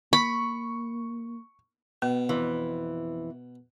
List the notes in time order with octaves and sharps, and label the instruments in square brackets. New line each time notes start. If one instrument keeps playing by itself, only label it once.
[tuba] A#3 [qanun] B5 [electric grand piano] C#6
[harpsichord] B2 [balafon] B3
[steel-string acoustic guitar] F2 E3